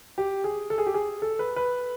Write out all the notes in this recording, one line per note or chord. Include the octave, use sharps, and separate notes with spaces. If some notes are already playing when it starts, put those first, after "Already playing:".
G4
G#4
A4
G#4
G4
G#4
A4
B4
B4